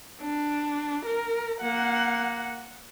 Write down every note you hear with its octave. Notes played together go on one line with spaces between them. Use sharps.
D4
A#4
A#3 F#5